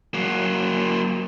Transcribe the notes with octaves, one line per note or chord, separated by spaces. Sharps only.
F#3 A#3